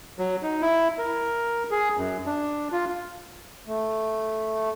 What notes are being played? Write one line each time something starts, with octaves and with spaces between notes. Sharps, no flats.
F#3
D#4
E4
A#4
G#4
F#2
D4
F4
A3